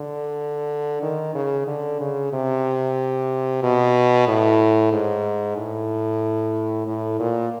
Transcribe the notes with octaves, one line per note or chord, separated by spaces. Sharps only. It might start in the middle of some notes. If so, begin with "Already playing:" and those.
Already playing: D3
D#3
C#3
D3
C#3
C3
B2
A2
G#2
A2
A2
A#2